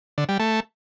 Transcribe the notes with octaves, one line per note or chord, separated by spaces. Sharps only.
D3
G3
A3